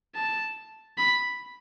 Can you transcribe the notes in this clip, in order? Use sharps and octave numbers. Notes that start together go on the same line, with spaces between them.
A5
B5